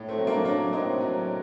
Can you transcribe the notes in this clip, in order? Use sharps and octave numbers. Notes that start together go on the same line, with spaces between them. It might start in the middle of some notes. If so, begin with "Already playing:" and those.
Already playing: A2
A3 C4
F#3
A#3 D4
F#3 A#3 D4
A2 C4 D#4
F#3